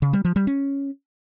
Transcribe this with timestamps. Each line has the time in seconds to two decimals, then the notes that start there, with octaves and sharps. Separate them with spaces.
0.02 C#3
0.13 G3
0.25 F3
0.36 G3
0.47 C#4